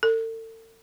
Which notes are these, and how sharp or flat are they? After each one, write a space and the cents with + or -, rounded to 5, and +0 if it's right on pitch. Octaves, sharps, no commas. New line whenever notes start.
A4 +40